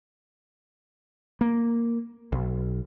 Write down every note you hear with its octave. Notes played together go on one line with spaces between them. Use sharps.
A#3
B1